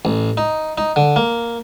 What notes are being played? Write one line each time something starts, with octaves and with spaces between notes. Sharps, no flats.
A1
D#4
D#4
D3
A#3